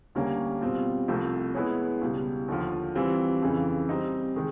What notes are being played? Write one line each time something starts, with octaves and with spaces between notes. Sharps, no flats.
D2 D3 G3 A#3 C#4
B2 G3 C4 F4
C2 C3 F3 A3
G#3 B3 E4 G#4 C#5
C#2 B2 G3
D#2 D3 F3
E3 G3 C4 F4
F2 C#3 E3
G3 C4 D#4
D#3 G#3